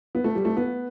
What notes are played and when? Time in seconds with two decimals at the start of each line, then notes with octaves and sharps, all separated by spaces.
0.15 B3
0.24 A3
0.35 G3
0.45 A3
0.57 B3